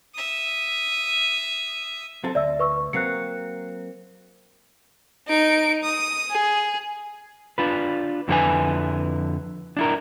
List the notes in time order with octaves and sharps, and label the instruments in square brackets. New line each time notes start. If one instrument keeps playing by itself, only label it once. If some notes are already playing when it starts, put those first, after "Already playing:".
[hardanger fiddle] E5 D#6
[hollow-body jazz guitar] F#3 C4 A4
[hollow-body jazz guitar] D2 [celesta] D5 E5 E6
[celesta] B4 C#6 E6
[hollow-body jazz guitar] F#3 A#3 C4 [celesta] F#6 C7 C#7
[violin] D#4 D7
D#6
G#4
[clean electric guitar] D4 F4 B4
F2 D3 E4 F#4 B4 G#5
D4 E4 A#4